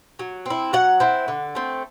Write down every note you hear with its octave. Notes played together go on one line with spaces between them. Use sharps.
F#3
C4 E4
F#3 F#5
C4 E4
D3
A3 C4